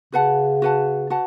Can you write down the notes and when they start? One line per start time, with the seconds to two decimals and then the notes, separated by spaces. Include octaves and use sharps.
0.12 C#3 F#4 B4 F#5 A5
0.62 F#4 B4 F#5 A5
1.10 F#4 B4 F#5 A5